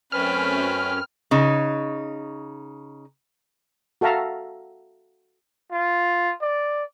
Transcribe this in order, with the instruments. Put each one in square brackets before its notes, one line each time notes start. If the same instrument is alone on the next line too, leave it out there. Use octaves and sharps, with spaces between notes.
[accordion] F#2 C#4 [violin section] A3 C4 [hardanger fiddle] B4 G5 [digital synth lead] F6
[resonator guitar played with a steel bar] C#3 D#4
[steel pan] F#4 A4 E5 F5 A#5
[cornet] F4
D5